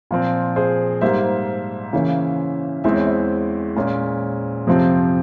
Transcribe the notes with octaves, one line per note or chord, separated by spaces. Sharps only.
A#2 F3 C4
G#4 C5
G#2 G3 A#3 C5 E5
C#3 E3 A#3 C#4
E2 E3 G#3 C4 E5
C#5
C5 E5
A#2 G#3 C#4
F2 C3 F3 C4